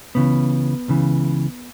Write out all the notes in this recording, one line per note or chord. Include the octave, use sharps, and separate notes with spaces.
C#2 C#3 E3 B3
C#2 C#3 E3